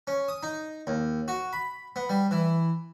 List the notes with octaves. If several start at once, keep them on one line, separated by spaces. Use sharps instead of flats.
C#4
D#6
D#4
D#2
F#4
B5
B3
G3
E3